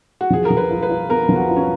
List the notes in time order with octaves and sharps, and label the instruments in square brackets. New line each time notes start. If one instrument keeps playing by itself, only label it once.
[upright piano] F#4
[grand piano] F3 [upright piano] G#4
[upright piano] A#4
[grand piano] F3
[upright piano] B4
[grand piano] F4
[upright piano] B4
[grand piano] F4
[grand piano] B3 [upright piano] A#4
[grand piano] F3
[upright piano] F#4
[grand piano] F4
[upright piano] C#4